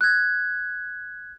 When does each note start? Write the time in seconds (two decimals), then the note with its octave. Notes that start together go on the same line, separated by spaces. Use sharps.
0.01 F#6 G#6